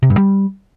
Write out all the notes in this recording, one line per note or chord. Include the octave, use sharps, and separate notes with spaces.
C3
G2
G3